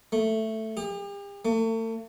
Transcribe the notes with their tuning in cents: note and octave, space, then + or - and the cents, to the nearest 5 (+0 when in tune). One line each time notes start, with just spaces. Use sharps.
A3 +5
G4 +45
A3 +40